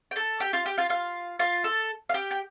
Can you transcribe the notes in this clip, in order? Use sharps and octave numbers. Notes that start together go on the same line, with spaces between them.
G5
A4 A5
G4 G5
F4 F5
G4 G5
F4 F5
F4 F5
F4 F5
A4 A5
F5
G4 G5
G5